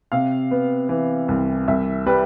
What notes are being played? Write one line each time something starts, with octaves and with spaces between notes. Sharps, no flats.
C3 F5
B3
E3
C2
C2 E5
G3 B4